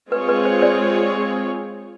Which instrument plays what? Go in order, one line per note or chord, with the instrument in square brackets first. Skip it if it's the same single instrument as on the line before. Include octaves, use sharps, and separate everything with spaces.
[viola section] G#3 C4 F4 G#4 C#5 [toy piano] B4
[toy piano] B4
C5
C5 D5